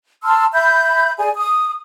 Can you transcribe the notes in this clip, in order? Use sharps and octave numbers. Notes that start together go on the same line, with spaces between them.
A5 C6 E6 F6
E5 B5 G6
G#4 D5 G#5
D#6